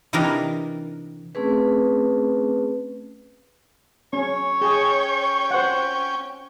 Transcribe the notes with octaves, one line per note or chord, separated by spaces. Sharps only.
C3 E3 D4 D#4 G4 A#4
A3 C4 C#4 G#4 B4
C#4 C#5
C#4 G#4 G5
C5 F#5